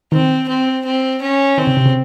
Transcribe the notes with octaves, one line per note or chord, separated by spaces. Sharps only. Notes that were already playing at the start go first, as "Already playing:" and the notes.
D#3 C4
C4
C4
C#4
D#3 C4
C#3
C3
C#3